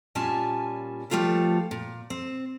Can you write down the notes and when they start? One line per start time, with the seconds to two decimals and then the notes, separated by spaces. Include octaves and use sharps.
0.15 A#2 G3 C#4 F4 G#5 A5
1.10 F3 G3 A3 F4 A4 B4
1.71 A#2
2.10 C4